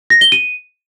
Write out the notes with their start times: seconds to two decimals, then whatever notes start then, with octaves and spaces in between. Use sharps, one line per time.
0.10 A#6
0.21 G7
0.32 D#7